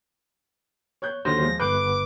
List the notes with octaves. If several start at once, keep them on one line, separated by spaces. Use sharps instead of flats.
C#5 F#6 G6
D#2 D3 F#3 C5 A#6
F3 G#3
G1 B4 D6 F#6 G6 C7